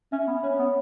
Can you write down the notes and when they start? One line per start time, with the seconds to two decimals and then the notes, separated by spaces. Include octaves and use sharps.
0.12 C#4 E5
0.27 B3 B5
0.43 C#4 C#5
0.59 B3 B5